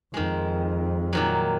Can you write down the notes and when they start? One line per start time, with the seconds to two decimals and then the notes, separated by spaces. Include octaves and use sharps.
0.14 F2 D#3 G#3
1.13 A#2 D#3 F#3